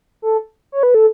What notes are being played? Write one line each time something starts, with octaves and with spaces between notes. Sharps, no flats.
A4
C#5
B4
A4